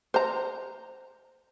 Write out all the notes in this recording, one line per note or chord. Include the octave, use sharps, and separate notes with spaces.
C5 A#5